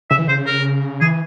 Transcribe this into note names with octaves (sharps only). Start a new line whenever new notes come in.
C#3 E5
E3
C#3 C5
A#4
E3 G#4